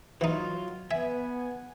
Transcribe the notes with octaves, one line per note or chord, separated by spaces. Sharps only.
E3 F#3 D#4 F4
B3 E5 G#5